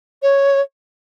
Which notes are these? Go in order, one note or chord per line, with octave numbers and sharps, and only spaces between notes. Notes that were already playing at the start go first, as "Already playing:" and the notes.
C#5